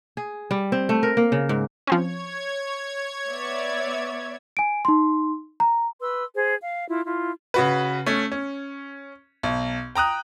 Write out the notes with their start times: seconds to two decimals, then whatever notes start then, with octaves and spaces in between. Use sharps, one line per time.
0.17 G#4
0.51 G3
0.72 C4
0.89 A3
1.03 A#4
1.17 A#3
1.32 C#3
1.49 G#2
1.87 F3 C4 C#4 C#5 G#6
3.29 B3 D5 E5
4.57 G#5 D7
4.85 D#4 C6
5.60 A#5
6.01 B4 C6 E6
6.35 G#4 C5
6.63 F5
6.89 E4 F4
7.06 E4 F4
7.54 C#3 F#4 B4
8.06 A3 C#4
8.32 C#4
9.43 B1
9.95 G5 A#5 D#6 F#6